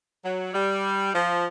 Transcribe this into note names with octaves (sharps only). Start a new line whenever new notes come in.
F#3
G3
F3